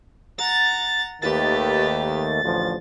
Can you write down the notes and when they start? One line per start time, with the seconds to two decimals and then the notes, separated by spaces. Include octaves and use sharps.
0.38 F#5 A#5 A6
1.22 D#2 D#3 A3 G4 B4 A6
2.42 A1 D2 F3